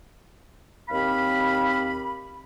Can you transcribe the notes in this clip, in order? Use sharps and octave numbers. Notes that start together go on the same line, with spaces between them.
D#2 C4 G4 F5 B5